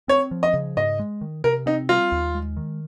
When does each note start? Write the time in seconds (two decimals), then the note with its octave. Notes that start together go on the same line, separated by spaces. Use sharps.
0.08 C4 C#5
0.31 F3
0.43 D#5
0.54 C#3
0.77 G#2 D#5
0.99 G#3
1.21 D#3
1.44 C3 A#4
1.66 C4 D#4
1.89 G3 F4
2.12 D#2
2.35 G#3
2.57 D#3